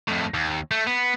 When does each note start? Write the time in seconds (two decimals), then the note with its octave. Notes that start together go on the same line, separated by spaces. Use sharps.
0.08 F2 A2
0.34 D#2
0.71 A3
0.87 B3